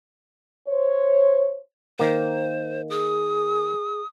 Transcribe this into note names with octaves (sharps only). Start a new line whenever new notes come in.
C5 C#5
D#3 A#3 C5
G#4 D#6